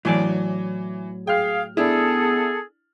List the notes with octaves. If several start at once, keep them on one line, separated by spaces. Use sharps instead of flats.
A2 E3 F#3 D5 G#5
G#4 F5 G5 F6
B3 D4 E4 G#4 A4